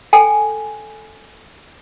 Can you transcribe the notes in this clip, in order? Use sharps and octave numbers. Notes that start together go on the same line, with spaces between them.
A4 G5 G#5